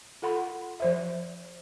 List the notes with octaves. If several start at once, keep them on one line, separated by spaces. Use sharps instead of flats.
F4 A4 F#5 B5 C6
F3 C5 E5